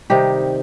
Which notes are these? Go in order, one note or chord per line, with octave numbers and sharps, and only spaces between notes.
C3 D#3 G3 D#4 G4